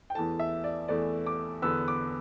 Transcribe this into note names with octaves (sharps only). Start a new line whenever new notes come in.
G5
E2 E3 A3 A5
E5
D5
E2 E3 A3 D5
D6
E2 D3 B3 E6
D6